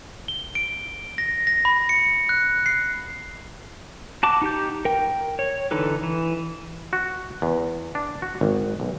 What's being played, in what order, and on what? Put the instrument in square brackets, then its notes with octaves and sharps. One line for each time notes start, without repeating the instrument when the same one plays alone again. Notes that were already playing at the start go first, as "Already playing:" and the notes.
[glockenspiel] G7
D7
A#6
A#6
B5
C#7
F#6
C7
[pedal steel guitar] F#4 A5 D6
D#4 G4 G6
A#4 G5
C#5
D3 E3 D#4 A4 B4
E3
[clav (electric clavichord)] F#4
E2
D4
F#4
G#1
B1